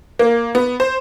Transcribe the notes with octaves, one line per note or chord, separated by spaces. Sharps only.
A#3
B3
C5